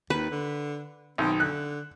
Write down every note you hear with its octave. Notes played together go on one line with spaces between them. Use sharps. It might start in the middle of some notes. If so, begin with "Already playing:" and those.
D#2 B4
D3
B1 D#3 C4
D3 F#6